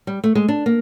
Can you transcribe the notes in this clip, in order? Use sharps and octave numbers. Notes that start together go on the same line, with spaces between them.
G3
A3
G#3
D4
A#3